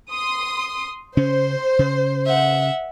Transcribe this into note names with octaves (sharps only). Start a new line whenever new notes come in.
C6 D#6
C#3 C#4 C5
C#3
E5 F#5